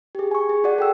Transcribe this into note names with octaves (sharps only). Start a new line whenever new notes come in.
G4 G#4
G#5 C#6
G#4
F#4 G#4 D5 F#5
A4 G5 E6